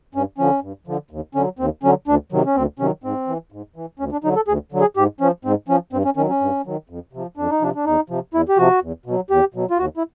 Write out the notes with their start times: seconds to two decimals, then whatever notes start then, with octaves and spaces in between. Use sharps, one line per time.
0.15 G2 C#4
0.38 D3 F3 C#4
0.63 G2
0.87 D3 F3
1.11 D#2
1.35 D3 F#3 C#4
1.59 D#2 C4
1.83 D3 F#3 C#4
2.07 D2 D4
2.32 C3 D#3 F#3
2.46 C#4
2.56 D2 C4
2.79 C3 D#3 F#3 C#4
3.04 G#2 C4
3.28 E3
3.52 G#2
3.76 E3
4.00 D2 C#4
4.12 D4
4.24 D3 F#3 D#4
4.36 A4
4.48 D2 G#4
4.72 D3 F#3
4.81 G#4
4.97 G#2 G4
5.21 F3 C#4
5.45 G#2 C4
5.68 F3 C#4
5.93 G2 C4
6.05 C#4
6.17 D#3 C#4
6.21 F#3
6.29 C#4
6.41 G2
6.66 D#3 F#3
6.89 F2
7.13 C3 F3
7.37 F2 D4
7.50 D#4
7.61 C3 F3 D4
7.76 D4
7.86 E2 D#4
8.10 C3 F3
8.34 E2 E4
8.49 G4
8.58 C3 F3 F#4
8.82 E2
9.06 B2 F#3
9.30 E2 G4
9.54 B2 F#3
9.71 F4
9.78 D#2 F#4
9.97 E4